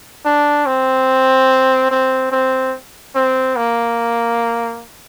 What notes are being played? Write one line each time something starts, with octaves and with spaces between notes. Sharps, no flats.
D4
C4
C4
C4
C4
A#3